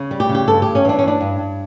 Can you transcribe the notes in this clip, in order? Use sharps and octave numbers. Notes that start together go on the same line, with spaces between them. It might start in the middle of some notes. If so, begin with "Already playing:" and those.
Already playing: C#3
G3
G4
C#3
G4
G2 A4
G2 G4
C#4
E3 D4
C#4
G2
D4
G2
G2